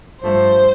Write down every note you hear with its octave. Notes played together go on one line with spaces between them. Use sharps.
G2 F3 A3 C5